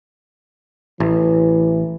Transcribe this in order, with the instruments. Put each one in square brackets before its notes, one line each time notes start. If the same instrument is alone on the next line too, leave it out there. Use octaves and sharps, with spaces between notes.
[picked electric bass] A1 [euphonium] E3